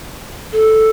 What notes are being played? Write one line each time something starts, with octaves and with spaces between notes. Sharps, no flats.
A4